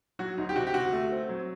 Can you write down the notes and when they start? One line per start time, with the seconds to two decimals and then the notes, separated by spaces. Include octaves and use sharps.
0.19 F#3 F#4
0.38 D2 D#4
0.49 G4
0.56 C3 F#4
0.67 G4
0.74 D2 F#4
0.93 A3
1.11 C4
1.29 F#3